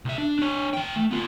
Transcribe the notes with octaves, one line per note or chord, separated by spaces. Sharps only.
C2 E5
D4
D4 C#5
E3 G5
A3
B3 F4